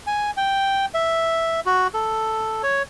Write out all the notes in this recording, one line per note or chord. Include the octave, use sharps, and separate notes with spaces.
G#5
G5
E5
F#4
A4
C#5